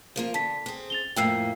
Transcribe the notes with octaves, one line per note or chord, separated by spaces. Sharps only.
F3 A#3 F4
D3 A5 B6
C4 G#4
A6 F7 G7
F2 A2 A#3 G5 E6 C7